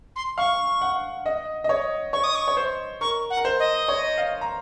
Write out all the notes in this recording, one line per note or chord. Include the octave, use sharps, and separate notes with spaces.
C6
F5 C#6
F#5
D#5
D#5
C#5
C#5 C#6
D#6
C#6
C#5
C5
A#4 C#6
F#5
A#4
C5
D#5
C#5
F5
A#5